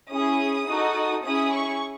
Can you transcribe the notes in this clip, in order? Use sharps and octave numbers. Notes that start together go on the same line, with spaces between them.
C#4 E4 G#4 D#6
D#4 F#4 A4
C#4 E4 G#4 D#6
C#6